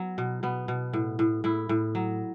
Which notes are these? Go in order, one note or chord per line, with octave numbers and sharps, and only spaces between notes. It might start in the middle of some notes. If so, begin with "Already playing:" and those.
Already playing: F#3 B3
B2
B2 B3
B2
A2
A2
A2 E4
A2
F#3